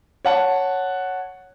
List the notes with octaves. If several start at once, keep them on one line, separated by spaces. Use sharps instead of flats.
C#5 F#5 A5